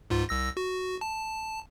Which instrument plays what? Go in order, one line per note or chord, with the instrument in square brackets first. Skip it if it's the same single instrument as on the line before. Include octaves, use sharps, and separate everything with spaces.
[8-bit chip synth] C#2 G#2 F4
C2 E6 A#6
F#4
A5